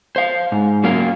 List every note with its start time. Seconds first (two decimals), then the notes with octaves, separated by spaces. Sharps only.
0.16 C5 F5
0.52 G#2
0.84 F#3 A#3 C#4 F4 A#4 F5